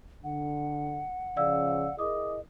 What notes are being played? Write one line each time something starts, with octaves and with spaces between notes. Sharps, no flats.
D3 F#5
C#3 F3 D5 F5 E6
E4 G#4 A#4 D#5 D6 D#6